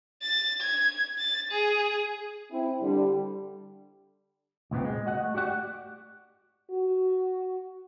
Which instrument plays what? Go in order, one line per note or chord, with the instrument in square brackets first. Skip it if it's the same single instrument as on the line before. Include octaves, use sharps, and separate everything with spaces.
[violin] A6
G#6
A6
G#4
[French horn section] C4 E4
D3 G3
[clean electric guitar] C#2 A#2 B3 C4
G#3
F#4 D#5 F#5
A3
F#4 G4 D5 F#5
[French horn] F#4